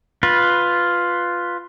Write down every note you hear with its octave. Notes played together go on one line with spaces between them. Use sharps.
F4 B4